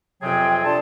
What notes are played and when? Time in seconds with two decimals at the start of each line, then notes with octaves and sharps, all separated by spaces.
0.22 F2 C3 F#3 C4 G#4 G5
0.65 D4 F4 A4 C5 A5